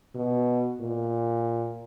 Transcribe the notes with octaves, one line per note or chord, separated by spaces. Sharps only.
B2
A#2